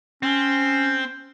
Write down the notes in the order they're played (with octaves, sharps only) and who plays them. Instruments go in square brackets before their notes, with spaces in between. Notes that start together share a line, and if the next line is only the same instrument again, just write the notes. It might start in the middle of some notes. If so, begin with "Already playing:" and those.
[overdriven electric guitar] C4 [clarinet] C#4